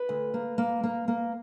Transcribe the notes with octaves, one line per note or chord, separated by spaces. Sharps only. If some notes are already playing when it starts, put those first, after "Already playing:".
Already playing: B4
D2
A#3
A#3
A#3
A#3